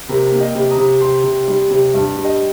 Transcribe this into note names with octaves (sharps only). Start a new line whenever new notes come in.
C3 A#4
A#3
D#5 G5
C3
A#5 D#6
C3
C3 G5 C6
C3
G3
C3
G2
G3
D#5 G5